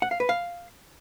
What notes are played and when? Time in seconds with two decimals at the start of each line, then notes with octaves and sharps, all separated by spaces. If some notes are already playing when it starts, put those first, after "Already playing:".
0.02 F#5
0.11 F5
0.20 B4
0.29 F5